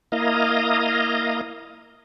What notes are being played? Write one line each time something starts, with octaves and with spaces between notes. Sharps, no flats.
A#3 E4 D#5 F5 A#5 D#6